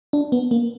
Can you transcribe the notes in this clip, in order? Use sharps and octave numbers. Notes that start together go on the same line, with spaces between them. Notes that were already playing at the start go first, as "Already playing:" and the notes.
D4
B3
A#3